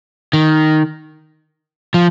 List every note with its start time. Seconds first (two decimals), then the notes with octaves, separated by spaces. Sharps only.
0.33 D#3
1.94 F3